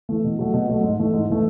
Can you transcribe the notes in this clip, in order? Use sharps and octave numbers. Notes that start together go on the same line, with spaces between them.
E3 A3
B2
F#3 A3
B2
F#3 A3
G#2
E3 A3
G#2
E3 A3